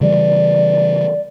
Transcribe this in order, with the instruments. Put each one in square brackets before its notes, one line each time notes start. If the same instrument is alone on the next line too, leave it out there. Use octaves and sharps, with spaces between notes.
[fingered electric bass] C#3 E3 G3 [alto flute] D5